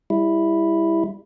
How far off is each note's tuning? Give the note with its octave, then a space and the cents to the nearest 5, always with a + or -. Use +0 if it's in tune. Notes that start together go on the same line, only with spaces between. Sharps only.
G3 +30 E4 +0